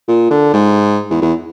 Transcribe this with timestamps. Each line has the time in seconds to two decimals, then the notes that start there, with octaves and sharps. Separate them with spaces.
0.08 A#2
0.30 D3
0.53 G#2
1.10 E2
1.21 E2